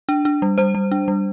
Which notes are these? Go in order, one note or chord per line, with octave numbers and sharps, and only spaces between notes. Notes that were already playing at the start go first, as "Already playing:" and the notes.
D4
D4
G3
G3 C5
G3
D4
G3